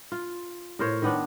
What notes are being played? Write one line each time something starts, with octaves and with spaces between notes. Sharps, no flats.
F4
A2 A#4 C5 C#5
D#3 B3 D4